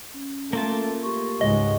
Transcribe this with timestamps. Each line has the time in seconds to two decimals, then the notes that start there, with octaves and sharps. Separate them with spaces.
0.14 C#4
0.53 A3 A#3 F4 A5
1.03 G4 C6 C#6
1.41 C#2 G#2 G#3 D#5